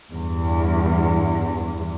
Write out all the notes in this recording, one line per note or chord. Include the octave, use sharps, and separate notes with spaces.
E2 G2